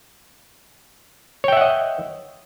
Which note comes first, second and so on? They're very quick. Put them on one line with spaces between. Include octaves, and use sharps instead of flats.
C#5 G5 E5 F#5 D#5